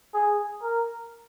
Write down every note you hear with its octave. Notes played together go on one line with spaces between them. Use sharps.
G#4
A#4